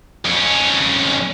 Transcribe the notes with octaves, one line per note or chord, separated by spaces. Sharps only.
F2 C#4